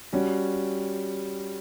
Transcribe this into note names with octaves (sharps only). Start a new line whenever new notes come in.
G3 C#4 F#4